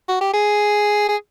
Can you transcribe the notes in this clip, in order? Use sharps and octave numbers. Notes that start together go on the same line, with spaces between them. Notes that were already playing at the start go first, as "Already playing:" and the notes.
F#4
G4
G#4
G#4